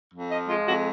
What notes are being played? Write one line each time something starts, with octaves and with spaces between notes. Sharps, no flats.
F2
F3 D#5
G#3 F4
F2 F#4